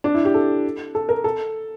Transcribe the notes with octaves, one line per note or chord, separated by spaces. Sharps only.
D4
E4
G4
A4
A4
A#4
A4